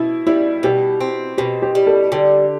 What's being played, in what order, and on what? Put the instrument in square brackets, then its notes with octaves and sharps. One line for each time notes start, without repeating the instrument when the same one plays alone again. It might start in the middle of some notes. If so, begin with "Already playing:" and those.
Already playing: [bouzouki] B2 [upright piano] E4
[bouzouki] G3 [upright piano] E4
[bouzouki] B2 [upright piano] G4
[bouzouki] C4
[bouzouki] B2 [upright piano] G4
[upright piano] G4
[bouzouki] G3
[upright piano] A4
[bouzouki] D3 [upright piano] G4